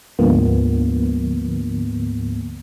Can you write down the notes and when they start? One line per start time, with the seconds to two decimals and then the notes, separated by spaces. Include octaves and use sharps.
0.19 D2 G#2 D3 F3 A#3 B3